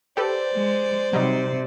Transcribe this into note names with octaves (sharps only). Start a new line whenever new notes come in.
G4 A4 B4 C5 D5
G#3
C3 F#3 G3 D#4